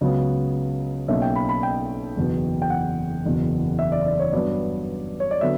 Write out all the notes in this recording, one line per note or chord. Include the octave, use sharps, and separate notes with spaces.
C#2 C#3 F#3 B3
B1 B2 A#3 C#4 E5
G5
B5
B5
G5
F#1 E2 B2
G5
F#5
F#1 E2 B2
E5
D5
D5
C#5
G2 F#3 B3 D5
C#5
D5
D3 F#3 B3 E5